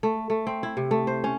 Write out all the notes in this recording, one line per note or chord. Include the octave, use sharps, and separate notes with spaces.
A3
A3
C4
E4
C3
A3
C5
C#4